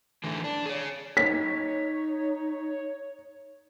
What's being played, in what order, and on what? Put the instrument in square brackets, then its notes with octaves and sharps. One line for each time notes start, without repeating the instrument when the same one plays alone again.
[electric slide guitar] D3 E3 A3
D4
G#4 C#5
[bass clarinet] D#4 [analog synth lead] C#5 [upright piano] B6